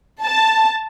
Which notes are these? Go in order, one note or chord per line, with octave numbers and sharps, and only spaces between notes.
A5